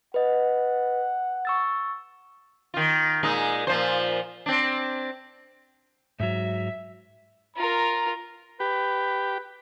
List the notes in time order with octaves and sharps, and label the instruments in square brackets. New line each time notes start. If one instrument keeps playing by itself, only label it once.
[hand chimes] B4 D#5 [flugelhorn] F#5
[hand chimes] C#6 E6 A6
[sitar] D#3 F4
A#2 G#3 D#4
A#2 F3 C5
C4 D4
[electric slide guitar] G#2 F#3 [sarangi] E5
[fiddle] F4 A#4 [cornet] A#5
[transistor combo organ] G4 [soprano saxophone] B4